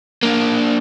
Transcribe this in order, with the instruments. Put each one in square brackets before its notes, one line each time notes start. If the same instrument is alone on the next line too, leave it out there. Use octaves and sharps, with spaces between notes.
[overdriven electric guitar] A#3 D4